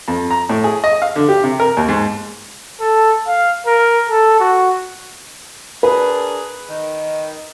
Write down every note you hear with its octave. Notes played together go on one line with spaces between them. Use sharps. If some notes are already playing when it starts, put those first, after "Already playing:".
F2
A#5
A2
G#4
D#5
F5
D3
G4
C3
A#4
D#2
G#2
A4
F5
A#4
A4
F#4
D4 G#4 A#4 B4
D#3